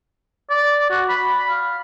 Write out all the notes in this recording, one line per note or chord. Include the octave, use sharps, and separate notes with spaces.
D5
F#4
B5
F5